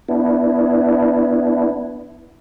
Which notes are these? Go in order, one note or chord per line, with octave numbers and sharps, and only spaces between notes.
B3 D4 E4